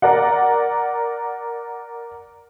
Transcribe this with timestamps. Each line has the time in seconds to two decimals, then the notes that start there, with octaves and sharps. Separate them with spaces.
0.02 A#4 D5 F#5